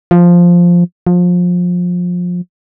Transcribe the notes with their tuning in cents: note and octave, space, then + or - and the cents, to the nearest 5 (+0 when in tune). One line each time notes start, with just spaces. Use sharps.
F3 +0
F3 +25